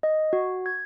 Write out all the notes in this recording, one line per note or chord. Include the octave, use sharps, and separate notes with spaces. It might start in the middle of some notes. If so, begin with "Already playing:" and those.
D#5
F#4
G#6